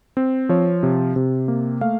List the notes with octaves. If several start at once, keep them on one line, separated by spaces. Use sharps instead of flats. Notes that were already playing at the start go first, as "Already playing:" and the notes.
C4
F3 C#5
C3
C3
A#3
A3 F5